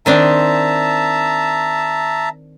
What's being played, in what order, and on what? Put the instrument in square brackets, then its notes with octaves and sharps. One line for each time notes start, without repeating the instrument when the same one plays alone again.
[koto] D#3 C4 D4 [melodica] E5 A5 A#5